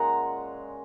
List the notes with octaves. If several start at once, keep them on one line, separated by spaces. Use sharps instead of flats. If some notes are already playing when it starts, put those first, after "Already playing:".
Already playing: A#2 G#3 C#4 F4 F#5 G#5 A#5